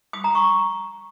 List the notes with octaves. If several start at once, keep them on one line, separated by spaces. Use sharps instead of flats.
D#6
A#5
C#6